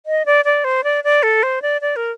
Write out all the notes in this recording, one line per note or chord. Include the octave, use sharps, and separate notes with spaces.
D#5
D5
D5
C5
D5
D5
A4
C5
D5
D5
A#4